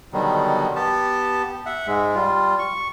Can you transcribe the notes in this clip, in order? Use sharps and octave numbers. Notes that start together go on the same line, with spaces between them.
B2 D3 D#3 F#3 G3
B3 G4 A5
E5 F#5
G#2 G#3
G3 F4
C#6